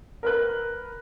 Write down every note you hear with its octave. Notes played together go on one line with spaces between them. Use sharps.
A#4 B4 F#6